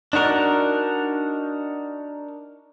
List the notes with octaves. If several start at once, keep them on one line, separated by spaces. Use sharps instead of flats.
D4 D#4 F#4 A#4